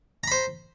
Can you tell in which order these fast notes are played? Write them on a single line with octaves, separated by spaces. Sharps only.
A#5 B5 C5